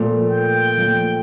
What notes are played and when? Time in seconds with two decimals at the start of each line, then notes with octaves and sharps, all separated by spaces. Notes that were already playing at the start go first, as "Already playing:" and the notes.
Already playing: A#2 F3 A3
0.31 G5
0.76 A#2 F3 A3